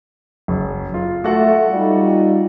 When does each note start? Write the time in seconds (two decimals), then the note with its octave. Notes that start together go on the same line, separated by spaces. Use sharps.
0.48 F#1
0.94 F4
1.24 A3 F#4 A4 F#5
1.70 G3 D#4 F4